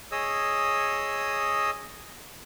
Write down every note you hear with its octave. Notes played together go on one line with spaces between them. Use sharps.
G#4 C#5 D#5 D#6 E6